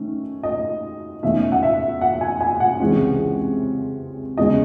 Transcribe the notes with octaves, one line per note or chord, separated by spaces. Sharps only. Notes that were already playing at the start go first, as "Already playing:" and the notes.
Already playing: D#3 A3 C#4
D#5
E2 D#3 A3 C#4 E5
F#5
E5
F#5
G#5
G#5
F#5
C#2 C3 E3 G#3 C#4
E2 C#3 G#3 C#4 D#5